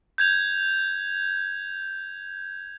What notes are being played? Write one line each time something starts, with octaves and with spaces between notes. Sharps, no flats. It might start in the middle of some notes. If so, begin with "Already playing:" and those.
G6 G#6 F7